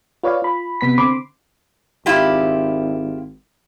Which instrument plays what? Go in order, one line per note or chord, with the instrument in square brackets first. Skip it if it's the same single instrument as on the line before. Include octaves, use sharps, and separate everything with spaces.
[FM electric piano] F4 B4 C#5 D5 F5
F4 B5
C3 B3 B5 B6
D3 C4 B5 C6 D6
[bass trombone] G#1 [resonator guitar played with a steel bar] E4 F4 G4